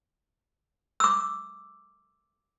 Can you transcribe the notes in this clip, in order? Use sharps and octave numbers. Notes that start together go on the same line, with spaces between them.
D6 E6